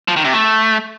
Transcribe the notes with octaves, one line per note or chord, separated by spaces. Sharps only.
F3
D#3
C3
A3